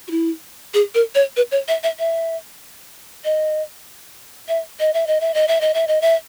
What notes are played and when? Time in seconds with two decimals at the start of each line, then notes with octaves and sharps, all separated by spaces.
0.08 F#4
0.11 E4
0.74 G#4
0.95 A#4
1.15 C#5
1.37 B4
1.51 C#5
1.68 E5
1.83 E5
1.99 E5
3.25 D#5
4.48 E5
4.80 D#5
4.94 E5
5.07 D#5
5.21 E5
5.34 D#5
5.48 E5
5.61 D#5
5.74 E5
5.88 D#5
6.01 E5